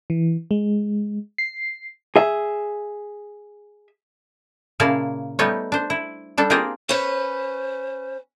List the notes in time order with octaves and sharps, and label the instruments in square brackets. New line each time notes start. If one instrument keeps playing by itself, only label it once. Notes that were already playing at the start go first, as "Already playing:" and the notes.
[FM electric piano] E3
G#3
C7
[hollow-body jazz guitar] G#4 E5
[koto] A#2 C#3 A#3 E4 F5 A5
G3 A3 B3 D#4 C#5
D4 C5
E4
G3 D4 A4
A#3 C4 F4 G4 G#4 A#4
[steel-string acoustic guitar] C#4 B4 [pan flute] C5